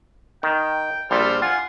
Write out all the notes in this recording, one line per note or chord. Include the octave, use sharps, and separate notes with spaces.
D#3 G5
A#1 G3 A4 C5 D5 F6
F4 F#5 G#5 C6